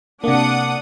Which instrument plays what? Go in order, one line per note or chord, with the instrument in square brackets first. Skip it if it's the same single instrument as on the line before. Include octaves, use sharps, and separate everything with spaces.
[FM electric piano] C3 A#3 [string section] D4 F#5 D#6